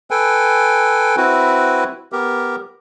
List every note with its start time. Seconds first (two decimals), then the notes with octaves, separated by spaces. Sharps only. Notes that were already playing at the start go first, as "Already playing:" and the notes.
0.11 A4 B4 G5 G#5
1.17 C4 E4 F#4 B4
2.12 B3 G4 A#4